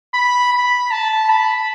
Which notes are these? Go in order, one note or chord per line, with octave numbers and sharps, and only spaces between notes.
B5
B5
A5
B5